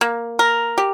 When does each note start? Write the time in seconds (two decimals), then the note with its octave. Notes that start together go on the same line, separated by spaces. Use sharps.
0.01 A#3
0.39 A#4
0.78 G4